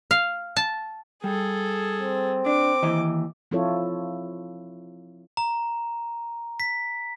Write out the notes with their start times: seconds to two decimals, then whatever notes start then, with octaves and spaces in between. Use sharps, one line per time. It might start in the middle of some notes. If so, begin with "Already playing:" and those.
0.11 F5
0.56 A5
1.24 G3 G#4 A4
2.00 C4
2.46 D4 D6
2.83 D#2 E3 D#5
3.51 F3 C4 E4 F4 A4 C#5
5.37 A#5
6.60 B6